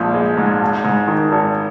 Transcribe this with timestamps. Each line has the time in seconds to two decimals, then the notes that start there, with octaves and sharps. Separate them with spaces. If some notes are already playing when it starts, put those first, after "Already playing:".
Already playing: A#1 G#2 F3
0.14 G#3
0.37 G#2
0.61 G#1
0.84 G#2
1.08 D#3
1.32 G#1